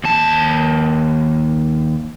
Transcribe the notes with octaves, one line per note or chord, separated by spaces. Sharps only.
D#2 A5